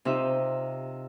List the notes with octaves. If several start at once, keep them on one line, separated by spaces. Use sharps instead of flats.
C3 D#4 F4 E5